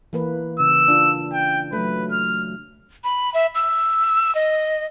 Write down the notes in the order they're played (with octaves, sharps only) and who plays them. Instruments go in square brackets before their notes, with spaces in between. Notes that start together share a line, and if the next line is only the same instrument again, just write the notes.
[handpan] E3 A#3 B4
[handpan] C#3 [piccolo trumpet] E6
[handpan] D4 F4
[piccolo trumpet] G5
[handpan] F#3 A3 [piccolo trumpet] B4
[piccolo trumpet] F6
[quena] B5
E5
E6
D#5